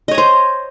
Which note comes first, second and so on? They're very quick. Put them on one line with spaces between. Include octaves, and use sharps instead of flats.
D#5 C#5 A#5 C5